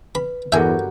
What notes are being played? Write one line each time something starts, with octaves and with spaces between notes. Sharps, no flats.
B4 B5
E2 G2 F#3 A4 A#4 E5 G#5 G6